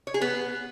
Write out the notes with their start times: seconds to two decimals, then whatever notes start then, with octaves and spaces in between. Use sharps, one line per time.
0.07 C#5
0.14 G#4
0.21 B3